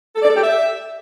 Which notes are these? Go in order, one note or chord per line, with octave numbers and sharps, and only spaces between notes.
A4
D5
A4
G4
E5